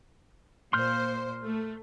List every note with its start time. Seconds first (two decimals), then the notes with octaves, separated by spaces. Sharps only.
0.73 A#2 C5 C6 F6 G6
1.44 A3